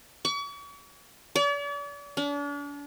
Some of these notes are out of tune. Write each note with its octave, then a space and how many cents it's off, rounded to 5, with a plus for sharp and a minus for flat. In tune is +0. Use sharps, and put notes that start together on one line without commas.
C#6 +40
D5 -45
D4 -40